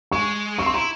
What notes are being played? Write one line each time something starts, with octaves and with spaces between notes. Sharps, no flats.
G#3 C#6
C4 C#6
C6
E4 A#5